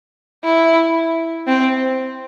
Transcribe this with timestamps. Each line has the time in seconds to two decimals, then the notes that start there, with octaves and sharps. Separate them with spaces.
0.44 E4
1.47 C4